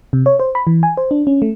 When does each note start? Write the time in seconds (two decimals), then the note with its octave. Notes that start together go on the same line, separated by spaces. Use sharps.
0.13 C3
0.26 C#5
0.40 C5
0.55 B5
0.67 E3
0.83 G#5
0.97 C5
1.11 D4
1.27 C#4
1.42 A3